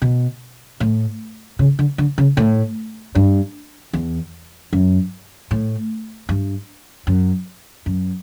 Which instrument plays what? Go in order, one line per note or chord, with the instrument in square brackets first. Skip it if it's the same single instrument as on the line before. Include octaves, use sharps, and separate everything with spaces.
[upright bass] B2
A2
C#3
D3
D3
C#3
A2
G2
E2
F#2
A2
G2
F#2
F#2